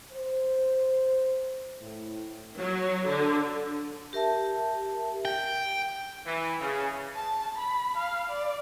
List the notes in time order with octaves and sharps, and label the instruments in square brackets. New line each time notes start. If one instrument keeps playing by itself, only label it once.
[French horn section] C5
A2
[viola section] F#3
D3
[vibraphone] G4 A#4 E5 A5
[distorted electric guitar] G5
[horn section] E3
C#3
[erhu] A5
B5
F5
D5